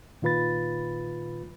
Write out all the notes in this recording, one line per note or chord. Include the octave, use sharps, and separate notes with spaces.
A#2 D#3 F4 B4 B5 A6